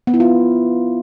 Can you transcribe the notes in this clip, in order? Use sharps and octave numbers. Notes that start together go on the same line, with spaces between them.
B3
E4
F4